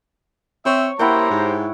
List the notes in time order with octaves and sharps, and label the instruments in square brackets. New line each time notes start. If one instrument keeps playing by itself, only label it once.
[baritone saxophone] C4 [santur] C#5 [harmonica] E5 E6
[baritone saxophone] A#3 [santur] E4 F#5 G5 [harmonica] G4 C5 A#5
[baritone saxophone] G#2